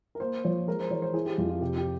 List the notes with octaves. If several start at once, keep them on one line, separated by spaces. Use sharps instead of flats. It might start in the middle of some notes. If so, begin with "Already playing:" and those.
A#4
A#3 C5
F3 C#5
G#3 A#4
C5
E3 C#5
C5
E4 G#4
G4
F2 F4
F4
C3 G4
G4